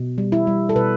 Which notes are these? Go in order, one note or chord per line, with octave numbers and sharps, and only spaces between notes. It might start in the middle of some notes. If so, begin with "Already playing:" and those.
Already playing: B2
G3
E4
G3
A4
B2 B4